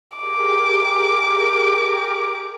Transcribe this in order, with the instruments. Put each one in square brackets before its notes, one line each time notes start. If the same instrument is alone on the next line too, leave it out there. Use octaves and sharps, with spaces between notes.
[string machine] G4 G#4 A#4 [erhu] D6